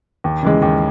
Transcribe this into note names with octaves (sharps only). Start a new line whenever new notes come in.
D#2
C#3 E3 G#3
D#2